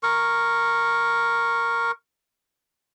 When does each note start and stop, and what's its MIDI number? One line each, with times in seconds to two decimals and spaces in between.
0.03 1.91 70
0.03 1.91 85